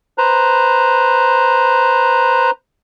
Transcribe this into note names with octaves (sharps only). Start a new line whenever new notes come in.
B4 C5 A#5